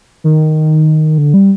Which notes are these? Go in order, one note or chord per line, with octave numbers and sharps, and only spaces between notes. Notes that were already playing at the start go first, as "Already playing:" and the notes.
D#3
D3
G3